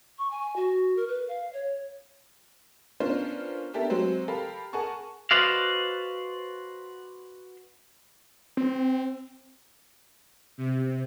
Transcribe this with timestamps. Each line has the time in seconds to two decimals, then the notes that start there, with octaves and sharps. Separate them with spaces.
0.18 C#6
0.30 G#5
0.56 F#4
0.96 A#4
1.07 B4
1.28 F5
1.53 C#5
3.00 B3 C#4 D4 F4 A#4 C5
3.74 B3 D4 G4 A4 A#4 E5
3.90 F#3 G#3 C4 C5
4.28 G4 A4 A#4 F5 B5
4.73 G#4 A#4 F#5 G#5 A5 C#6
5.31 F#4 B4 C5 D5 D#5 F5
8.57 C4
10.58 C3